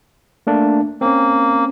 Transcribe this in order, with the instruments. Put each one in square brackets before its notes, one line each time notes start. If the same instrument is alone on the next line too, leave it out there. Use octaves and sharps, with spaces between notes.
[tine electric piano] A3 A#3 D4
[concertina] A#3 [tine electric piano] C4 C#4